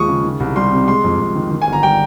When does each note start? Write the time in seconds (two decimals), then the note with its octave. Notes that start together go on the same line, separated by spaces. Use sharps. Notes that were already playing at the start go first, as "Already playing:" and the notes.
Already playing: D#2 F3 G#3 C#6 D#6
0.08 C#3
0.24 D#3
0.40 C2
0.56 G3 C6
0.72 C3
0.88 G#3 C6
1.04 F2
1.20 F2
1.35 D#3
1.51 D#3
1.62 G#5
1.67 G1
1.73 A#5
1.83 G3 G5